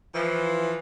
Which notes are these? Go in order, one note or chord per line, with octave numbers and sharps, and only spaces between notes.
E3 F3